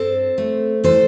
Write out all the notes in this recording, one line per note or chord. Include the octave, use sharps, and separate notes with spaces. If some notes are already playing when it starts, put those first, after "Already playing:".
Already playing: G2 C4 A4 C5
A3
E3 A4 C5